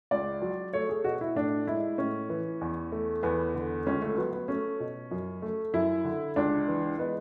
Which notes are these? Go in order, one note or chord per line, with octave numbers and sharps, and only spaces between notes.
C#2 D5
F#3
A3 C#5
G#4
B2 F#4
E4
A2 D4
G#3 E4
A2 C#4
E3
E2
A3
E2 B3
D3
C#2 C#4
A3
F#3 B3
B3
A3 C#4
B2
F#2
A3
F#2 E4
D3
C#2 D4
E3
G#3 B3